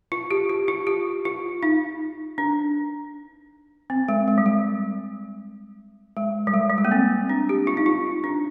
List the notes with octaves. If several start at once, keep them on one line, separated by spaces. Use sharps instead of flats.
F4
G4
G4
F4
G4
F4
D#4
D4
C4
G#3
G#3
G3
G#3
G#3
G3
G#3
G3
G#3
A#3
C4
D4
G4
F4
D#4
F4
D4